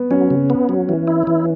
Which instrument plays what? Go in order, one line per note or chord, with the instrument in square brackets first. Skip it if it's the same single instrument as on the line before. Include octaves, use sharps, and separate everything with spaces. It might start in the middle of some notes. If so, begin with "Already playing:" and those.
Already playing: [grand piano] B3
[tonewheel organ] F#3 [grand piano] C#4
[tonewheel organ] C#3
B3
F#3
E3
E4
E3